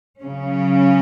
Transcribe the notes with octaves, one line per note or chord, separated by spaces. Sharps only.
C#3 F#3 C#4